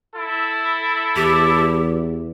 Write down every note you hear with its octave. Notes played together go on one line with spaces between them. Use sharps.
E4 A4
E2 G4